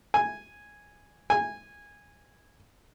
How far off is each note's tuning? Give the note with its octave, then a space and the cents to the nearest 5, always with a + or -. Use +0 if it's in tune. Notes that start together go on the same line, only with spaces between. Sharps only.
G#5 -5
G#5 -15